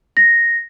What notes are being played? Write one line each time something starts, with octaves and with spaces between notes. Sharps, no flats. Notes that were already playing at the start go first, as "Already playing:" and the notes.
A#6